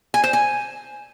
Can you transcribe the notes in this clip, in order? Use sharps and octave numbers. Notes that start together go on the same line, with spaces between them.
G#5
C5
G#5